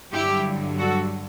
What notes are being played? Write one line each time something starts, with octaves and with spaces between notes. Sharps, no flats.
G2 D3 F#3 E4 G4
F#4 A4